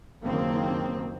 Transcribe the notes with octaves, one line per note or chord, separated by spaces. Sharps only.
F#1 D#2 D#3 A#3 C4